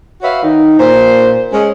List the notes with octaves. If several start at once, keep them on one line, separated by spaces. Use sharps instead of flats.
F#4 B4 C#5 E5 F5
D#3 D#4
A#2 C5
G#3 C#4